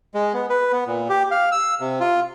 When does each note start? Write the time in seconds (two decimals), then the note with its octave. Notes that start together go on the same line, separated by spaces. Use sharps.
0.14 G#3
0.34 B3
0.50 B4
0.72 B3
0.87 A#2
1.09 G4
1.31 F5
1.52 E6
1.80 C3
2.00 F4